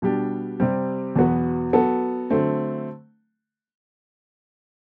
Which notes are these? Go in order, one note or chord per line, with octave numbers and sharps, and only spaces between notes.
B2 G3 D4 G4
C3 G3 C4
E2 B2 F#3 B3 F#4
F#3 B3 F#4 A4
D3 F#3 A3 C4